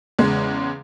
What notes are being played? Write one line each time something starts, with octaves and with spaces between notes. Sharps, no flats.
E2 C#3 G#3